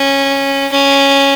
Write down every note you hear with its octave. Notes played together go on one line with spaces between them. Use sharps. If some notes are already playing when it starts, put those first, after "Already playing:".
Already playing: C#4
C#4